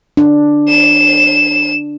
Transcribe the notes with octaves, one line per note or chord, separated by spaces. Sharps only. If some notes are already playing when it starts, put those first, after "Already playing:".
D4
E7